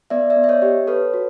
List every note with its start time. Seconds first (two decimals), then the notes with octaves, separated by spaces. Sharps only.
0.10 B3 D5 E5
0.30 D5 E5
0.36 B3
0.44 E5
0.49 C#5 D#5
0.62 G4
0.87 A4 B4 C#5
1.14 F#4